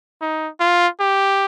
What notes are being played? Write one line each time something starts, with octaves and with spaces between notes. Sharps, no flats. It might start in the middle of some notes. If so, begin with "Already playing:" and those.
D#4
F4
G4